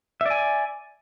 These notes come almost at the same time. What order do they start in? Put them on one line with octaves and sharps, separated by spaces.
E5 D5 G#5